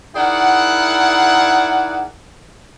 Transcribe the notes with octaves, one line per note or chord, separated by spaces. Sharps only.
D#3 E4 G#4 D5 F#5